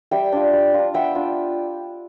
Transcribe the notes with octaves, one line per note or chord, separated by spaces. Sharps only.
G3 E5 G5
D4 F4
G3
D4 F4
B3 E5 G5
D4 F4